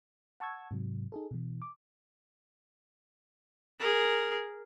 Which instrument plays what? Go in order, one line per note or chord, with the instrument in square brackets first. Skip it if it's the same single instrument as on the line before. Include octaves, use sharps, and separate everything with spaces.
[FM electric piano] F#5 A5 C#6 E6 G#6
G#2 C3 F#3
D#4 G#4 A4
B2 E3
D6
[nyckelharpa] G#4 A#4